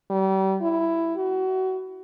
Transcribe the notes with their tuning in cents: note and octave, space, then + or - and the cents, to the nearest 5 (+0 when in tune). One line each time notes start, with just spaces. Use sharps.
G3 -35
E4 +10
F#4 +25